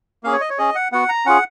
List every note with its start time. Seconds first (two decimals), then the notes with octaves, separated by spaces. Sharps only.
0.24 A#3 C#4 G#4 F5
0.32 C#5
0.41 D#5
0.50 C#5
0.58 C#4 G#4 D#5
0.75 F#5
0.92 B3 F#4 F#5
1.09 A#5
1.26 C#4 F4 G#4 F#5